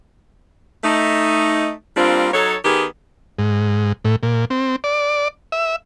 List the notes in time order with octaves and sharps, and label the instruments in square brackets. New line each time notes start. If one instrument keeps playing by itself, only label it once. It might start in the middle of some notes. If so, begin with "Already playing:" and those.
[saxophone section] A3 D#4
G3 A#3 C4 D4 F4
F#3 D#4 A4 C#5
D#3 B3 G4 G#4
[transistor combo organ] G#2
A2
A#2
C4
D5
E5